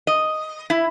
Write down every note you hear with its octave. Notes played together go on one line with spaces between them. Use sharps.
D#5
E4